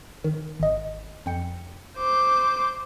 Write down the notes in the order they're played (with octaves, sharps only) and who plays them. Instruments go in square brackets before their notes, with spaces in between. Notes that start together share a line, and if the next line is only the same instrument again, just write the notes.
[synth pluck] D#3
G#1 D#5
F2 G5 C#7
[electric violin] C5 D6